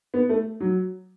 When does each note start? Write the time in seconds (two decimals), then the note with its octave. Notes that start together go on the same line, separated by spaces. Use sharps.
0.14 B3
0.29 A3
0.60 F#3